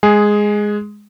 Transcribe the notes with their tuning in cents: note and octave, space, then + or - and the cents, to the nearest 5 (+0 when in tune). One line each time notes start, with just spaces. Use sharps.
G#3 +0 G#4 +0